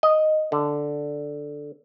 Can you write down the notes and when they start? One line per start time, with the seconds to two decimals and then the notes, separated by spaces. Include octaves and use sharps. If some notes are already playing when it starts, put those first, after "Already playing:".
0.03 D#5
0.52 D3